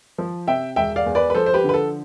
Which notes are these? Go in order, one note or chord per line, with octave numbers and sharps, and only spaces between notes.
F3
C3 E5 G5
E1 E5 G5
D5 F5
E2
B4 D5
B4
F3 A4 C5
C5
G4 B4
D3
B4
A4